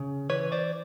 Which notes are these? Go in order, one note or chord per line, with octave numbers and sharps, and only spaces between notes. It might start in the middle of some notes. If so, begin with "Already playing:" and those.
Already playing: C#3
E3 B4 C#5
C5 D5